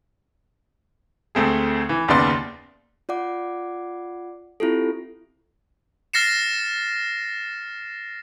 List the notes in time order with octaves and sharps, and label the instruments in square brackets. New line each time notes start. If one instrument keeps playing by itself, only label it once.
[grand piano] D2 A3 C4 G#4
E3
F#1 D#2 C#3 B3 D5 C6
[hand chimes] F4 D5 F#5 D6
C4 E4 F4 G4 A4
[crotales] F6 A6 A#6 C7 C#7 E7